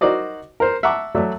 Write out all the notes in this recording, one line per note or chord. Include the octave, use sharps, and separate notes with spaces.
D#4 F#4 A#4 C5 D5 D#5
A#4 C5
E5 F#5 A5 A#5 C#6 D6
F#3 A3 D5 E5